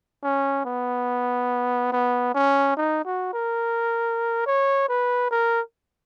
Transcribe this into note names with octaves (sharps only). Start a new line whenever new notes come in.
C#4
B3
B3
C#4
D#4
F#4
A#4
C#5
B4
A#4